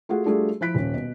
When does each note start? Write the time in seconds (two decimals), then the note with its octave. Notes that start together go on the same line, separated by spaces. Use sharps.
0.09 A3 F4 F#4 G#4 F#5
0.26 G3 A3 D4 F4 F#4 G#4
0.61 F3 E4 F#6 B6 D7
0.74 D#1 C#4
0.94 B2